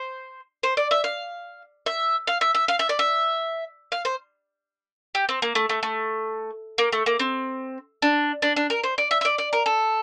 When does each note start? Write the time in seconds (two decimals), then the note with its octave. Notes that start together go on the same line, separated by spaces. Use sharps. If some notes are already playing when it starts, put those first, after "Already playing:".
Already playing: C5
0.63 C5
0.77 D5
0.91 E5
1.04 F5
1.86 E5
2.27 F5
2.41 E5
2.55 E5
2.68 F5
2.79 E5
2.89 D5
2.99 E5
3.92 F5
4.05 C5
5.15 G4
5.29 C4
5.42 A#3
5.55 A3
5.69 A3
5.83 A3
6.78 A#3
6.92 A3
7.06 A#3
7.20 C4
8.02 D4
8.42 D4
8.56 D4
8.70 A#4
8.84 C5
8.98 D5
9.11 E5
9.21 E5
9.25 D5
9.38 D5
9.53 A#4
9.66 A4